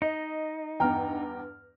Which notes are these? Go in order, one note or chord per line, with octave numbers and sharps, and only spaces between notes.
D#4 D#5
E2 G2 G5 A#5 F6